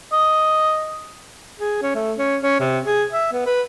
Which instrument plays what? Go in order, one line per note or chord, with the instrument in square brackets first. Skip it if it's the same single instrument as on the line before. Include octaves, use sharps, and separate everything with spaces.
[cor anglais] D#5
[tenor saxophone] G#4
C#4
A3
C#4
C#4
C3
G#4
E5
B3
B4